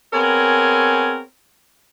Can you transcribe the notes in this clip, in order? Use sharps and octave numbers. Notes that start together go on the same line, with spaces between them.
B3 C4 G#4 A#4 C#5 G#5